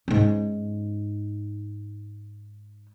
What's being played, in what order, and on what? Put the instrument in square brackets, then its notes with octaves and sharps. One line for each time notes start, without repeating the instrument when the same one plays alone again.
[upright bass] G#2 C#4